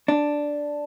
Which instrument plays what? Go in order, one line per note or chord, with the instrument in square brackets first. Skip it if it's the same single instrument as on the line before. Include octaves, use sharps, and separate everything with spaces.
[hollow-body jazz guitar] D4